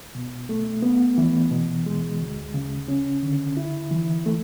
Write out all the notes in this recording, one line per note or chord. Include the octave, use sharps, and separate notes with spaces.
B2
A3
B3
E3
B2
G#3
D2
C#3
C#4
D3
E4
E3
A3